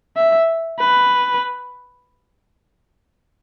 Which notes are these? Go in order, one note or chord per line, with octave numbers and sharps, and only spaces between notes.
E5
B4